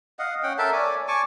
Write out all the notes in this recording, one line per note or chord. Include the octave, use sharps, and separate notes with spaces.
D#5 F5 F#5
C#4 F#5 G5
A4 A#4 E5 A5
C#5 D5 G#5
G#5 A5 C#6 D6